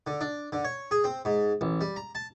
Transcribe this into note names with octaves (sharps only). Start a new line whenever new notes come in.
D3
D4
D3
C#5
G#4
C4
G#2
A1
G3
A#5
A5